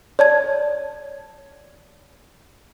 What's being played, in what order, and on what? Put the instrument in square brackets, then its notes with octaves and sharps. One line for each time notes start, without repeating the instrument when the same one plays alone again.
[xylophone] C#5 D5 A5 G#6